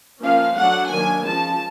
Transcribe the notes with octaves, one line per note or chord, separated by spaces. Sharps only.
F3 A#3 C#4 F5
F#3 A3 D4 F#5
D#3 F#3 A#3 D4 G#5
F3 G#3 C#4 A5